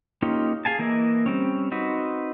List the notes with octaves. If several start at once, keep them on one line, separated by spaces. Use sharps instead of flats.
A#3 C#4 D#4 F4 G4
G#4 F5 G#5 A5
E3 A#3 E4 D#5
G3 C4 C#4
C4 D#4 F#4 B4